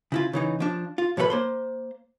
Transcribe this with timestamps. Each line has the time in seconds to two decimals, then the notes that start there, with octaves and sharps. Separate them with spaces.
0.12 C#3 E4 F4
0.33 C#3 E3 D#4
0.60 F3 D4
0.98 F4
1.17 A2 F3 A3 A4 B4 B5
1.30 A#3 C5 C6